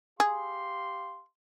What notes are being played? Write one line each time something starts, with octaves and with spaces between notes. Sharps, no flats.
G4 G#4 F5 C6